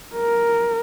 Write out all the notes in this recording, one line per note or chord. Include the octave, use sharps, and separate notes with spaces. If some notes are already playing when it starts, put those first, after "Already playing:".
A#4